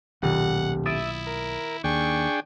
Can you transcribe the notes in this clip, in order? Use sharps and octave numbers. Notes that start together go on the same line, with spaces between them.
D#1 B1 F#5
E4 E5 D#6 A6 D7
A#4
D#2 D4 G#4 G5 C#6